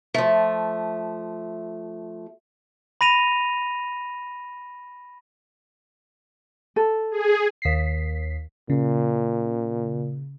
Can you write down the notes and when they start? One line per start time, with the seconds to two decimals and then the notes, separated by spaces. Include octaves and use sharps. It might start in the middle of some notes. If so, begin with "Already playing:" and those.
0.14 F3 A3
3.01 B5 A#6 D#7 F7
6.76 A4
7.11 G#4
7.62 D#2 B6 C7
8.70 A#2 C#3